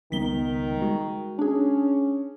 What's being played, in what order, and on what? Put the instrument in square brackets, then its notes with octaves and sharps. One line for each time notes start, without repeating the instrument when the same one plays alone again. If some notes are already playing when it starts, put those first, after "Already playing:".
[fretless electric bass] C#2 G3 B3 [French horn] D#3 [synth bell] B6 G7
[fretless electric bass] G#3 [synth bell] F#4
[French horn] C#4 [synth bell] D4 G#4